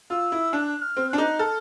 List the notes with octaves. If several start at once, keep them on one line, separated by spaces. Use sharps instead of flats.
F4 E6
E4
D4 F#6
F6
C4
D4 F#6
D#4
A4 F6